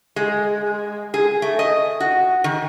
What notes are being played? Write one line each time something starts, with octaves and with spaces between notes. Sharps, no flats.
G#3
G#4
A3
D#5
F#4
D#3